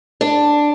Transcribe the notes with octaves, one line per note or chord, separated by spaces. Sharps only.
D4